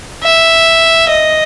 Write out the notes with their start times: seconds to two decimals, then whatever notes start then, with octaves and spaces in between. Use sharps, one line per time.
0.23 E5
1.09 D#5